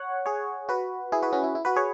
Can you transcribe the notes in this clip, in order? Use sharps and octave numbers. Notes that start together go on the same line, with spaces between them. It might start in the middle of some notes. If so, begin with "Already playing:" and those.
Already playing: C#5 F#5
G#4 C#5
F#4 B4
E4 G#4
F#4 B4
C#4 F#4
E4
E4
F#4 B4
G#4 C#5